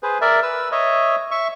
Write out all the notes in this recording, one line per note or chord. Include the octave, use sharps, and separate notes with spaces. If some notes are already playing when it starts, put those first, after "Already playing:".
G#4 B4 C5
A#4 D5 E5
B4 E6
C#5 D#5 E5
E5 C#6